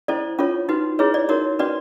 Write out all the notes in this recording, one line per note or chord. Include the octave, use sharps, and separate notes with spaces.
C#4 E4 A4 C5 D5
C#4 F4 A4 C#5
D#4 F#4 B4
E4 G#4 B4 C#5
D5
D#4 F#4 A#4 C#5
C#4 F#4 B4 D5